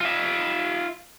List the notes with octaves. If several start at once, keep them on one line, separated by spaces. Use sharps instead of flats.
F4 E5